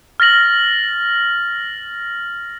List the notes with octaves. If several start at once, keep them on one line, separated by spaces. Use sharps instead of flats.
F6 A6 A#6 F#7